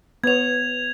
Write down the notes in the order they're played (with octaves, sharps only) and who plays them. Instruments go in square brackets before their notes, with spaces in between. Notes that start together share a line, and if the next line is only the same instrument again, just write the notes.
[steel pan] B3 C#5 [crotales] G#6 F7